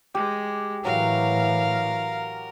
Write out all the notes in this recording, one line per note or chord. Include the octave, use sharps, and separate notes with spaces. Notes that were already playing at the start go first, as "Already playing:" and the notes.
G#3 G4
A2 E3 F#3 A#4 F5